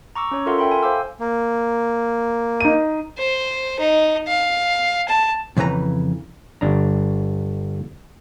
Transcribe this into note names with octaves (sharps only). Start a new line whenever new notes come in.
A#5 C#6 D6 E6
C#4 C#5
F4 A4 A#4 E5 F#5 C6
A4 E5 G5 B5 C6
G#5
C5 F5 D6 E6
A#3
D#4 D#7
C5
D#4
F5
A5
F2 C#3 E3 B4 A#5
G1 D4 A#5